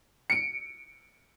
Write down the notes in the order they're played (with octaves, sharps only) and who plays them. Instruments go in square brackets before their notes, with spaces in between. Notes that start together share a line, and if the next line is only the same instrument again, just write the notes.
[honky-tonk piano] C#7 D7